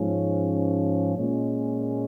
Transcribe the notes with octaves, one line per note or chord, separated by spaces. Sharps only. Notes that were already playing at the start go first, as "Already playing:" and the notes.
Already playing: G#2 F3 C#4
A#2 G#3 C#4